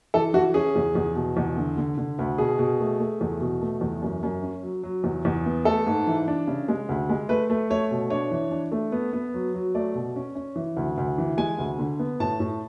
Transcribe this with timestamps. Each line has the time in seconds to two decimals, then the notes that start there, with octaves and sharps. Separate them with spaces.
0.14 E3 A4
0.34 E3 F#4
0.54 C#4 G#4
0.76 E2
0.95 E2
1.15 B2
1.37 E2
1.57 D3
1.77 D3
1.98 D3
2.19 D2
2.38 B2 G#4
2.59 B2
2.80 A3
3.00 A3
3.21 E2
3.41 B2
3.61 A3
3.81 E2
4.02 F#2
4.23 F#2
4.43 C#4
4.63 F#3
4.83 F#3
5.04 E2
5.25 E2
5.46 B3
5.65 A3 A4
5.87 G#2
6.07 E3
6.28 D4
6.47 C#3
6.68 G#3
6.89 D2
7.09 G#3
7.29 A3 B4
7.50 A3
7.70 A3 C#5
7.91 B2
8.10 D4 C#5
8.31 E3
8.51 D4
8.72 A3
8.92 B3
9.13 B3
9.34 F#3
9.54 F#3
9.74 A3 D5
9.95 B2
10.16 C#4
10.35 C#4
10.56 E3
10.77 D2
10.98 D2
11.18 E3
11.37 G#3 G#5
11.59 D2
11.79 D3
11.99 B3
12.20 A2 A5
12.40 A2